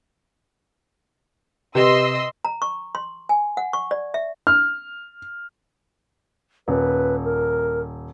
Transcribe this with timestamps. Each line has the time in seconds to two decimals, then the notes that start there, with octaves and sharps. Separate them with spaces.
1.75 C3 G4 B4 D#5 C6 E6
2.45 A#5
2.62 C#6
2.95 C6
3.29 G#5
3.57 F#5
3.73 C#6
3.91 D5
4.14 E5
4.47 F6
6.68 D#1 B4
7.24 A#4